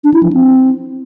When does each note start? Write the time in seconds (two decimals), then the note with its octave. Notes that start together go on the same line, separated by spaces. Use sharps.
0.04 D4
0.14 E4
0.23 F3
0.33 C4